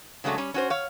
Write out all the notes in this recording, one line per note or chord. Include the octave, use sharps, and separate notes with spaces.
C#3 F#3 G#3 A3 D4
G3 C#4
C#4 F#4 C5
C#5 F5